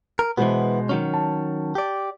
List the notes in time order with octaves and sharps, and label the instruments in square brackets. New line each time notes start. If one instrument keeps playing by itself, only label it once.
[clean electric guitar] A#4
[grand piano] B2 G#3 C5 [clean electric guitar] E3 B3
[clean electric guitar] D#3 F#3 C#4
[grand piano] A5
[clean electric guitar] G4 D5